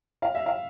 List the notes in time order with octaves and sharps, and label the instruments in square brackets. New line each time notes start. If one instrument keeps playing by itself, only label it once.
[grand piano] F5
E5
F5